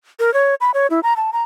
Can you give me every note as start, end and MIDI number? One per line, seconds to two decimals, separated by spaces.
0.20 0.33 70
0.34 0.55 73
0.61 0.71 83
0.74 0.87 73
0.90 1.00 64
1.03 1.14 82
1.17 1.31 81
1.33 1.43 82